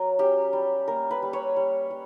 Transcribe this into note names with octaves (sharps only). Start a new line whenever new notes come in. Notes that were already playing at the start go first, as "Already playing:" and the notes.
Already playing: F#3 B3 A#4
C#4 G4
G3
A#3 A#4
B4
G3
C#5
G3
G3